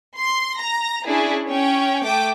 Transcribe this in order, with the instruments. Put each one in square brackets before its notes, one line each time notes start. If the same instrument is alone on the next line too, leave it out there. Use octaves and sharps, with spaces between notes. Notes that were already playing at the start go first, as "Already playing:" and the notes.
[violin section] C6
A#5 A#6
C#4 D4 E4 G#4
C#4 G5
A3 G5 D6